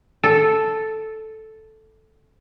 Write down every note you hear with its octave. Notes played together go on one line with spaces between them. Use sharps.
A4